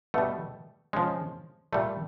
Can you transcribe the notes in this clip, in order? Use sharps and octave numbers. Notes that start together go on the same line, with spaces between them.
B2 G3 A3
C#3 F3 G#3
A#2 G3 A3